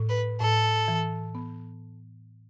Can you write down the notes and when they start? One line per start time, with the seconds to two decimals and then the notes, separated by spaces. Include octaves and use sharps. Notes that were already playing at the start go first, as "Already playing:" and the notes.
Already playing: A2
0.10 B4
0.41 A2 A4
0.88 E3
1.35 B3